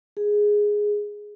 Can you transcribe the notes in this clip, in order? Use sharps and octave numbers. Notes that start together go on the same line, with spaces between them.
G#4